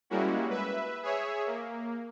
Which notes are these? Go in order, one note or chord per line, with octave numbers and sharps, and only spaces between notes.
G3 G#3 A#3 C#4 E4 F#4
B4 E5
G#4 C#5 E5
A#3